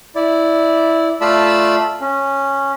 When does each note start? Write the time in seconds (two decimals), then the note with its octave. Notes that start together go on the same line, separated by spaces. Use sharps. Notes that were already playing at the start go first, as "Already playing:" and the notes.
0.15 E4 D5
1.21 A3 F4 D5 A5 B5 E6
2.01 C#4